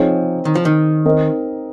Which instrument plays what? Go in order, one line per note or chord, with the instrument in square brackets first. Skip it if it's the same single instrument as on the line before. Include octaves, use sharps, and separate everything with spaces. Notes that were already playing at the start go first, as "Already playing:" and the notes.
Already playing: [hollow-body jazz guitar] F3 [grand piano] C4 D#4 G#4 C#5
[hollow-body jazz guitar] D#3
F3
D#3
[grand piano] C4 D#4 A#4 D#5